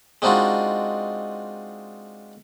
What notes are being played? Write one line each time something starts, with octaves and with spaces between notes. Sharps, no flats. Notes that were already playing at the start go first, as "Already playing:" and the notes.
G#3 C4 D4 D#4 F4 F#4